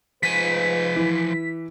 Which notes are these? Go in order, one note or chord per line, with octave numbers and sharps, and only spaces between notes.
G#2 F3 F4 B4 G#5 B6
E3